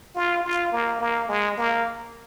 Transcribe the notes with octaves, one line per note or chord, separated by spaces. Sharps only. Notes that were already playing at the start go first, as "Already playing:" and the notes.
F4
F4
A#3
A#3
G#3
A#3